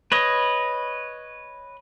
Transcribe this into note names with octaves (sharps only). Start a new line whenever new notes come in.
B4 C#5 D#5